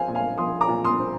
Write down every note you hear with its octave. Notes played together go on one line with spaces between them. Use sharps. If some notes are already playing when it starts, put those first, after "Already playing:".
Already playing: F3 C4 F5 G#5
A#2
F5 G#5
F3 C6 D#6
A#5 D6
A#2
C6 D#6
C4